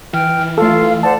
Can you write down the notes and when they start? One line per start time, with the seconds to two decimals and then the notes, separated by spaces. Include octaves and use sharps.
0.13 E3 G5 F6
0.58 A3 F4 A4 F5
1.03 C5 D5 F#5 A5